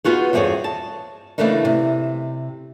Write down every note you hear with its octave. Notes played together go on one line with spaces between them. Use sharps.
B3 D#4 F4 F#4 G#4
E2 G2 C4 G#4 A4 C#5
A5
C#3 E3 A3 A#3 D4 D#4
C3